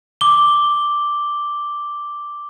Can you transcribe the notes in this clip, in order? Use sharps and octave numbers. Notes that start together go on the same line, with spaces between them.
D6 G7